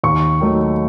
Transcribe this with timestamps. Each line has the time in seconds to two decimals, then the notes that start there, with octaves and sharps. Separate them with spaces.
0.04 D#2 C#6
0.41 D#3 F#3 A3